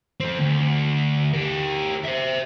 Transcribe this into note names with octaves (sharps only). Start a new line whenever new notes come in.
F3 C4
D2
G4 A#4
C5 E5